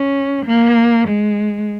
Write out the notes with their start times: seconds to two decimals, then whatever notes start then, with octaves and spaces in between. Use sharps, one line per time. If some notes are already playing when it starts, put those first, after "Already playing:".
Already playing: C#4
0.46 A#3
1.08 G#3